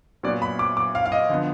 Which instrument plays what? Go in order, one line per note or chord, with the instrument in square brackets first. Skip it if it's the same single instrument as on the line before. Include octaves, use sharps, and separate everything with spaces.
[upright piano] A#2 F#3 B3 D5
B5
D6
D6
F5
F5
D#5
D3 F3 B3